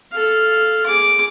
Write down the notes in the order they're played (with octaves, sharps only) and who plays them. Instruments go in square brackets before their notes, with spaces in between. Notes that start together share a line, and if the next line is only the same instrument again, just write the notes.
[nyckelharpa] A4 F5
G#4 D6